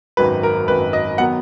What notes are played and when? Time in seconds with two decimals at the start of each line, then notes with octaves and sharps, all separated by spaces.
0.17 G#1 F#2 D#3 F#3 B4
0.43 A#4
0.68 G#1 F#2 D#3 F#3 B4
0.93 D#5
1.18 D#3 F#3 B3 F#5